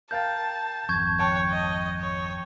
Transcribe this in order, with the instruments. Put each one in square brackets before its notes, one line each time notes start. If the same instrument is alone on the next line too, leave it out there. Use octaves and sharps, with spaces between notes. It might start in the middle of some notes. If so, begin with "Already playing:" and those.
[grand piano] A#4 F5 G5 [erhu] A5 [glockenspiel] G6 A6
[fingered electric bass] G#1 F2 [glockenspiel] C#6 G6 G#6
[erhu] C#5 [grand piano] G5 A5 F#6
[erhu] D#5
C#5